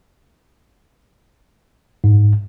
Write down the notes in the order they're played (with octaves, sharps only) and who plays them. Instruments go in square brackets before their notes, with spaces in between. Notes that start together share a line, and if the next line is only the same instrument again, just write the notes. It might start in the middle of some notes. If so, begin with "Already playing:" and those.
[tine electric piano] G#2